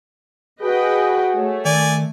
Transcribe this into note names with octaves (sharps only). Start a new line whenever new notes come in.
F#4 G#4 B4 D#5 G5
A3 C#5
D#3 D5 G#5